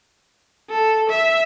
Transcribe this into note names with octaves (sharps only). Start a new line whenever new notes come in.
A4
E5